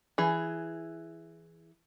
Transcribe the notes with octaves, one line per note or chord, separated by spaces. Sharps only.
E3 G#4